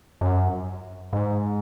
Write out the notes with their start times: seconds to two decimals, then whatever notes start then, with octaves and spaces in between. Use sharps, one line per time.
0.21 F#2
1.13 G#2